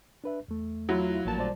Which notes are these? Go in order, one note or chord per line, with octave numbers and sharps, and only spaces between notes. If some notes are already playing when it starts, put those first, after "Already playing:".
D4 B4 E5
E2 A3
F#3 E4 F4
A1 A#2 F3 A5
G3 C5 D5